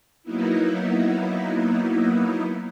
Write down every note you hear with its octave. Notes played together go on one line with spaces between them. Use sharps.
F#3 A#3 B3 D#4 E4